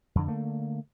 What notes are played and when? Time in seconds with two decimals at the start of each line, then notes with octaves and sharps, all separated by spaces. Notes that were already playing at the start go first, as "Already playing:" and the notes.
0.15 F2 D3
0.27 D3 A3 A#3